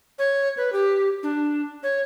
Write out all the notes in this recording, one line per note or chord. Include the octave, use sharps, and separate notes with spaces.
C#5
B4
G4
D4
C#5